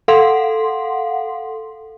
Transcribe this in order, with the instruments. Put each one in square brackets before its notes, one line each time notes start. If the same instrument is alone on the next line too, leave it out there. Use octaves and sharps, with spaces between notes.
[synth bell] A4 F5 F#5 C6